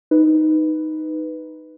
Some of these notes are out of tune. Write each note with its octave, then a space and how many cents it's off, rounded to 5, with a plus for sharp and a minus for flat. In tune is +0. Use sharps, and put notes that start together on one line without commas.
D#4 +0 B4 +0